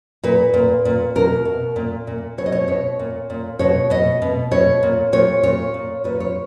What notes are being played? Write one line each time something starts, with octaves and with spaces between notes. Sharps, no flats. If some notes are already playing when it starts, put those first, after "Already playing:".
A#2 B4
A#2
A#2
B2 A#4
B2
A#2
A#2
B2 C#5
D#5
C#5
B2 C#5
A#2
A#2
B2 C#5
B2 D#5
B2
B2 C#5
A#2
A#2 C#5
A#2 C#5
A#2
A#2 B4
C#5